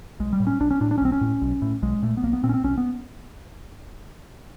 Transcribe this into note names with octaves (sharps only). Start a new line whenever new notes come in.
B1 G#3
G3
A2
C#4
B1 D4
C#4
A2 D4
D4
C#4
B1 C4
C#4
A2
B1
A2
B1 G#3
A#2 A3
B3
B1 A#3
B3
A#2 C4
C#4
C4
B1 C#4
B3